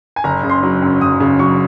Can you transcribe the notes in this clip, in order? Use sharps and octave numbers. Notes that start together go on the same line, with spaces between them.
G#5
F#1 A#5
C#3
C6
F#3
F#2
F#1 D#6
C#3
F#3 C#6